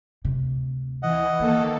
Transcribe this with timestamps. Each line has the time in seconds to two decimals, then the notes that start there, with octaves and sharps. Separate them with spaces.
0.25 D1 C3
1.03 E3 D#5 F#5
1.40 D#3 A#3 B3 A4